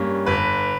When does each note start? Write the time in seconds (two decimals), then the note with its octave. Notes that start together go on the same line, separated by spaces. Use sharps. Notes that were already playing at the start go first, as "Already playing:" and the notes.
Already playing: G2 G3 A#3 C#4
0.26 G1 B4